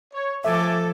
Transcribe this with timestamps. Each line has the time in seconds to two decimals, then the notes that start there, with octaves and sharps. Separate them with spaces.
0.13 C#5
0.44 F3 A3 A4 E5 G#5 D6